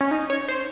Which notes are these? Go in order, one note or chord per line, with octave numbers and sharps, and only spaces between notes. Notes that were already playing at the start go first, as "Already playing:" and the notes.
C#4
D#4
C#5
C5